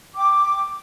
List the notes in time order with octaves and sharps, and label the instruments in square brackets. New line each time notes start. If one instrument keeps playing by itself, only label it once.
[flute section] G5 D6